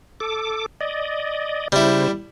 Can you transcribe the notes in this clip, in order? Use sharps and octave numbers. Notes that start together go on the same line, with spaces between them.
A4 D6
D5 D#5
C#3 G3 E4 C5